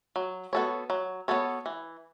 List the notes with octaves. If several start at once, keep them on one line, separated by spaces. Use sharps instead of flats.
F#3
B3 F#4 A4 C#5
F#3
B3 F#4 A4 C#5
E3